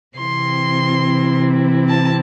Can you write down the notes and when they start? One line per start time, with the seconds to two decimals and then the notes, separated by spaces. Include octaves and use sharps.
0.15 C3 E3 C4 E4 C6
1.88 A5